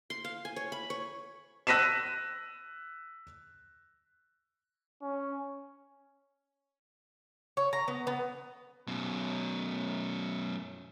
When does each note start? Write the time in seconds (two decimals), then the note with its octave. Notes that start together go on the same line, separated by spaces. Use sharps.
0.10 C6
0.25 F5
0.45 G#5
0.56 C#5
0.72 B5
0.90 C#5
1.67 E6 F#6 A#6 B6 D#7 E7
5.02 C#4
7.57 C#5
7.73 A#5
7.88 B3
8.07 B3
8.87 F#2 B2